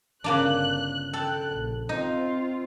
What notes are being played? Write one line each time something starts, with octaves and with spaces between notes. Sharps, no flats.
G1 C#3 A#3 D4 F#6
A4 G5 F#6
A#1
C4 D#4 F4